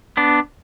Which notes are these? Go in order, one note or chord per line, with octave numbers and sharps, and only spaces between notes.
B3 D4